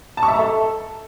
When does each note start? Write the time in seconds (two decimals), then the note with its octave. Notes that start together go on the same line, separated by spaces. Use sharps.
0.17 A5
0.23 C#6
0.28 E5
0.34 A#5
0.39 A4